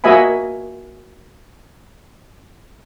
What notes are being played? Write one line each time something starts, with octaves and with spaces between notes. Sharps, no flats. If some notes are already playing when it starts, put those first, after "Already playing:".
A#3 F#4 D#5 E5 G#5 B5